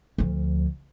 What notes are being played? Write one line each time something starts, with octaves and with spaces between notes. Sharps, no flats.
D2 F3